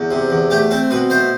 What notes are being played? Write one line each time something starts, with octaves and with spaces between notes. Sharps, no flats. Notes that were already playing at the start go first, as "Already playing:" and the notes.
Already playing: E2
C3
E2
A3 G4
C4 A4
B2 B4
A3 C5